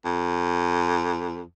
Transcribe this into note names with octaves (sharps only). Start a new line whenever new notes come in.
F2